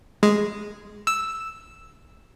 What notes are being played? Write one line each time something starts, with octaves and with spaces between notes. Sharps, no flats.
G#3
E6